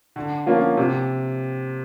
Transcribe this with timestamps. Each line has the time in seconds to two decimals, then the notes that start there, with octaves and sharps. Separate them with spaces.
0.16 D3
0.46 F3 A#3 C#4 F4
0.77 C3